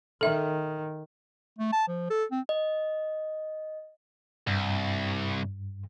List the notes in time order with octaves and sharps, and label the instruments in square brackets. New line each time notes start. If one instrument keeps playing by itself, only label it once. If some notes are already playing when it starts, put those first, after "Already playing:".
[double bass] D#3 [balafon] A4 E5
[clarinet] A3
A5
F3
A4
C4
[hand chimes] D#5
[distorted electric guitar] C2 [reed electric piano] G2